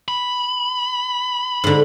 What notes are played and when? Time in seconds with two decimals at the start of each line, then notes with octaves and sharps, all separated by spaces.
0.08 B5
1.64 G#2 D3